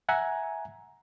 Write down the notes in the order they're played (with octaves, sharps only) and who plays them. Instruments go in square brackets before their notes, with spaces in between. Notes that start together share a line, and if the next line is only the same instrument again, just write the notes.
[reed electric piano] E5 F#5 G#5 A#5